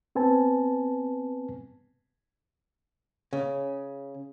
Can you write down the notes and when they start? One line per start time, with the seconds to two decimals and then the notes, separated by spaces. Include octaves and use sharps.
0.15 B3 C4 B4 G#5 A5
3.33 C#3